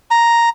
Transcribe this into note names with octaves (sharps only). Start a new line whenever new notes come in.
A#5